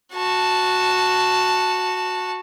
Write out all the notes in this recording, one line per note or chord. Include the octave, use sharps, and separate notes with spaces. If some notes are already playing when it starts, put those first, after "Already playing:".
F#4 A5